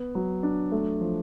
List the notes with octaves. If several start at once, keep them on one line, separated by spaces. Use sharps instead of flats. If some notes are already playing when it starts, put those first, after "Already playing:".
Already playing: B3
F#3
D4
A3
F3